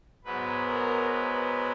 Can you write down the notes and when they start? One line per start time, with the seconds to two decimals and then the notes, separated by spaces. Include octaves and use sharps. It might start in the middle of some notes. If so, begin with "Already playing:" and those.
0.24 G#2 F#3 B3 B4
0.67 A#4
1.11 B4